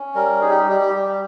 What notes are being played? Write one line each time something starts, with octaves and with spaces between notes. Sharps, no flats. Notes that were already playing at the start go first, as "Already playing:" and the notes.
Already playing: C#4
G3 A#4
D#4 G#4
G4
G3 G4
G4
G3